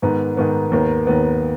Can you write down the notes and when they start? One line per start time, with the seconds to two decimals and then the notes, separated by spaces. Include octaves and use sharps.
0.02 G#2 D#3 B3
0.37 G#2 D#3 B3
0.72 D#2 D#3 B3
1.07 D#2 D#3 B3